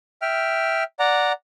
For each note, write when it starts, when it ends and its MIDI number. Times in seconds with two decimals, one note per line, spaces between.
0.22 0.84 76
0.22 0.84 79
0.22 0.84 89
0.99 1.32 74
0.99 1.32 78
0.99 1.32 82